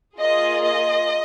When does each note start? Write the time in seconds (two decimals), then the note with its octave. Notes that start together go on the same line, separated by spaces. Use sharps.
0.18 A#3 F4 G#4 D#5
0.62 D#5